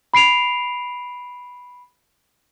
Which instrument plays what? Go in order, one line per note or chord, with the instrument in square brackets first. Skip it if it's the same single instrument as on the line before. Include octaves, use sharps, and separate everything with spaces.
[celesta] B5 C7 D7 F7